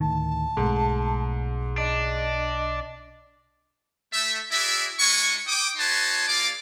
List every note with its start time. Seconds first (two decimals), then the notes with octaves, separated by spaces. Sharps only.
0.01 D2 A2 D#3 A5
0.57 B1 G#2 A3
1.78 D4 D#5
4.12 A3 E5
4.52 E4 F#4 G#4 D5 E5
5.00 G#3 D4 E4 G#5 C#6
5.47 G5 D6 D#6
5.77 D#4 F#4 B4 C#5 A5 C6
6.28 A#3 F4 G#4 D5 F5 D6